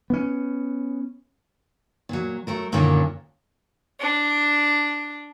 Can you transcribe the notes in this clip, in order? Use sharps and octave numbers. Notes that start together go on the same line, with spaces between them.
B3 C#4
A#2 F#3
F#3 A3 A#4
F#2 A#2 D3 D#3 A#3 C#4
D4